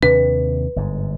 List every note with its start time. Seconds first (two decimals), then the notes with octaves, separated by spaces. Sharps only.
0.03 D#2 C3 D4 B4
0.76 G1 G#2